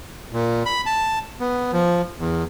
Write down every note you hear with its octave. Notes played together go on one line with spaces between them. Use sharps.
A#2
B5
A5
B3
F3
E2